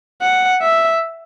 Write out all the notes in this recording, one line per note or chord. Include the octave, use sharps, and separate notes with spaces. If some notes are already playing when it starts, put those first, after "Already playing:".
F#5
E5